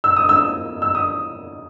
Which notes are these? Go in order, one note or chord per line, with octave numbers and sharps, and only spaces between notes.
E6
D#6
E6
E6
D#6